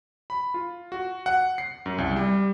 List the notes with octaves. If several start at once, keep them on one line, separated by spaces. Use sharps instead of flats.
B5
F4
F#4
F#5
C7
F#2
C2
G3